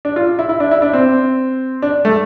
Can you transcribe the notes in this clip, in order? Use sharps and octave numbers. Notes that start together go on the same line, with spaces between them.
D4
F4
E4
E4
D4
E4
D4
C4
D4
A3